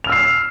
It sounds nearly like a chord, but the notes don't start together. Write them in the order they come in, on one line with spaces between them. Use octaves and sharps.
F7 F6 E6 C7